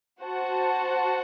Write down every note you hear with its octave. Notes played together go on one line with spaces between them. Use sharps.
F#4 C5 F#5 A5